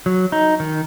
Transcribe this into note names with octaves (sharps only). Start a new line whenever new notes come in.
F#3
D#4
D#3